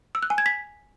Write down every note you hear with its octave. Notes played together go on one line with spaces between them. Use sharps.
E6
F#6
G#5
G#6
B6